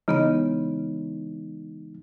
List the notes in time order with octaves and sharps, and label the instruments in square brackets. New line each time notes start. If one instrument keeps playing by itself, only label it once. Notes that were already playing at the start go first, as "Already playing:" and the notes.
[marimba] C#3 B3 D#5 [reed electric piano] E3 G#3 D#4